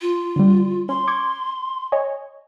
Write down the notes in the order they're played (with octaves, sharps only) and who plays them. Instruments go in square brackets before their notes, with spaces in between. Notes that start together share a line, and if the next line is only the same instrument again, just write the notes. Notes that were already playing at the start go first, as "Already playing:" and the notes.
[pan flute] F4
[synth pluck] D3 G3
[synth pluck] C#4 [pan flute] C6
[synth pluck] C#6 D6 G#6
C#5 D#5 G#5